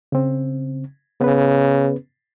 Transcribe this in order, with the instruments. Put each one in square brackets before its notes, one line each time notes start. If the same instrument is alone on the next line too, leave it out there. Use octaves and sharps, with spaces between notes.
[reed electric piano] C#3 C4
[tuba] C#3 [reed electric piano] B3 B4